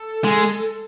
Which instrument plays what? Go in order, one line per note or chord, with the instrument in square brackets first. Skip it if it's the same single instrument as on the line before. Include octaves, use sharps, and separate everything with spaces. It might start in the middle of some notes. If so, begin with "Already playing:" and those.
Already playing: [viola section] A4
[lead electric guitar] G#3